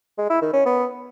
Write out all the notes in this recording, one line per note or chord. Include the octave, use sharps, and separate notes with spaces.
G#3
E4
D#3
C#4
B3